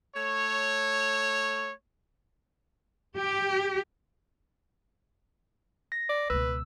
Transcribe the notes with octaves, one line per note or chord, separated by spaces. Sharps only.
A3 C#5
G4
A#6
D5
C#2 B2 B4 E6